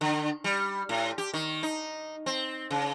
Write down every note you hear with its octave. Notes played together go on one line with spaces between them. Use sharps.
D3
G3
A2
G4
D#3
D#4
C4
C#3